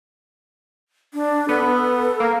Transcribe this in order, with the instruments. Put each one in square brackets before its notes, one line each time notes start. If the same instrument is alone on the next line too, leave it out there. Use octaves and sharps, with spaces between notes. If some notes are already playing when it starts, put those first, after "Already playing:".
[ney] D4
[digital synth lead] B3 [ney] A4
[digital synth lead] A#3